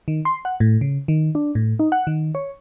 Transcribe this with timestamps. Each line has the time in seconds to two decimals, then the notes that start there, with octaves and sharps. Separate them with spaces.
0.08 D#3
0.25 C6
0.45 F#5
0.60 A2
0.81 C#3
1.08 D#3
1.35 D4
1.55 A2
1.79 D#4
1.92 F#5
2.07 D#3
2.35 C#5